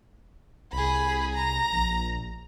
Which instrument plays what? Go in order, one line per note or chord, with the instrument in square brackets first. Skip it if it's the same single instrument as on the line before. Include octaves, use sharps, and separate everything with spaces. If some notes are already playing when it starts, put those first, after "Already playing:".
[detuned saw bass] C2 [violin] G#4 B5
[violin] A#5
[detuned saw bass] A#1